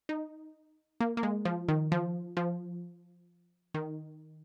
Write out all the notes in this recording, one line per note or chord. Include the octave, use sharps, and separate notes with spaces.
D#4
A#3
A#3
G#3
F3
D#3
F3
F3
D#3